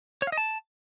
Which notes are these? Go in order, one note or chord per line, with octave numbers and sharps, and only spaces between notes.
C#5
F5
D#5
A5